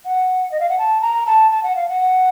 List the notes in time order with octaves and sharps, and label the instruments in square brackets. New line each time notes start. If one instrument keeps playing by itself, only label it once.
[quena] F#5
D#5
F5
F#5
A5
A#5
A5
A5
F#5
F5
F#5